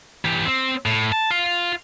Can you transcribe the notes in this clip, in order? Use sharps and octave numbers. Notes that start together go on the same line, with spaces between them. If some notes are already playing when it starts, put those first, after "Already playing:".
E3 G4
C4
A2
A5
F4 F5